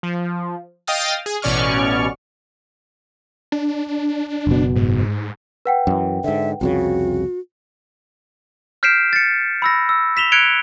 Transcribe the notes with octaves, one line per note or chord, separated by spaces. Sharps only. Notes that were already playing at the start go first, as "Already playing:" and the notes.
F3
D#5 F5 G5 D#6 F6 A6
G#4
A1 B2 C#4 D5 C#6 F6
D4
F#1 B2
G#2
B4 F#5 G5
F#2 E3
G#2 D3 E5
C2 F2 C#3 F#4
F6 G6 B6 C7 D7 E7
A6 C#7
B5 E6 A#6
E6
B6 E7 F7 G7
F#6 G#6 C#7 D7 F7 G7